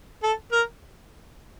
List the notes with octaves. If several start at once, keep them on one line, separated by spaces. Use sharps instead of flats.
A4
A#4